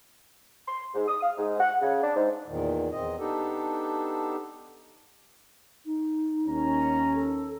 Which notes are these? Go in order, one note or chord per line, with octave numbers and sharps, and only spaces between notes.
C6
G#2
D#6
F5
G#2
F#5
C#3
D4
G#2
E2 A#2 D#3
E2 C4 D#5
B3 D4 D#4 G4 A4
D#4
D#2 C#4 A#5
A4